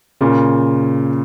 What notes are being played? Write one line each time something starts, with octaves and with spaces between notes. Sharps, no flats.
A#2 C#3